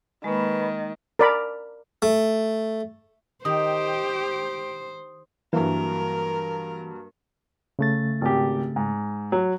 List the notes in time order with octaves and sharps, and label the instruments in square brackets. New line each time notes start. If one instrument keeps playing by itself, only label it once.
[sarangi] D#3 [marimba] G#3 A#3 [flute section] B4 B5 C#6
[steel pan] A#4 D5 B5
[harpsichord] A3
[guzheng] D#3 [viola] G4 G5 [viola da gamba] C5 [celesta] D#6
[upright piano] G2 F#3 A#3 [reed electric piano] E3 [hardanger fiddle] A#4
[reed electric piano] C#3 A3 A6
[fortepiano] G#1 G4
G#2
F#3